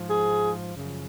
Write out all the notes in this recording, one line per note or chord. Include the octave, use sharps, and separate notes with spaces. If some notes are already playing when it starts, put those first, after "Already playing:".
Already playing: G#2 F3
G#4
F#2 C#3 F3